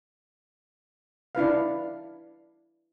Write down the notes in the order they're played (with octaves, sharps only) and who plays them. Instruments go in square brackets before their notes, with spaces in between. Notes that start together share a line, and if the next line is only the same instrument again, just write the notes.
[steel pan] D4 E4 B4 F5